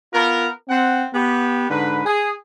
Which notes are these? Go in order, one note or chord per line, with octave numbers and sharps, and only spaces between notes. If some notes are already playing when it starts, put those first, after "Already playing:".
B3 F4 A#4
C4 F#5
B3 G4
G#2 D3 B4
G#4